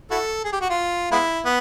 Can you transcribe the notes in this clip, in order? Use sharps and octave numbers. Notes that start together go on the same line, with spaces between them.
E4 F#4 A4
G#4
G4
F#4
F4
G#3 B3 E4
B3